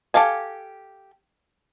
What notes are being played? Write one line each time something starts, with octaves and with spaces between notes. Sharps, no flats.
G4 A4 F5 G#5